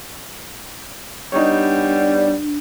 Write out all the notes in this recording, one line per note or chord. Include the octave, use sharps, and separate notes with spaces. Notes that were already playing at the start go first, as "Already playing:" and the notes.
G3 B3 D4 D#4 C#5